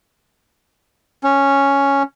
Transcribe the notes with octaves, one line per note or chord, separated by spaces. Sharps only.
C#4